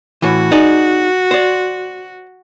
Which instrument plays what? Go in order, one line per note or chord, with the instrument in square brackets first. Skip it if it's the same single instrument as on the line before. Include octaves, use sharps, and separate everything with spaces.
[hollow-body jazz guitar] A2 E3 [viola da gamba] F#4
[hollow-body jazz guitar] D#4 G#4 D5
C5 D5